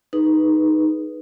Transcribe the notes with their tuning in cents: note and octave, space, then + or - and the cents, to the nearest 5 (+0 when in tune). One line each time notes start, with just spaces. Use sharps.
D#4 +0 G#4 +20 B4 -10